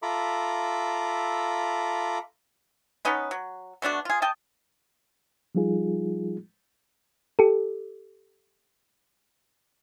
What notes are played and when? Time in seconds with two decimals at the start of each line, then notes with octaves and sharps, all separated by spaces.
0.03 F4 A4 E5 A#5 B5 D6
3.05 B3 C#4 D#4 B4
3.31 F#3
3.82 B2 A3 D4 F#4
4.05 F4 G#4
4.22 D#5 G5 A5
5.55 F3 G3 D#4 F4 G#4
7.39 G4 A4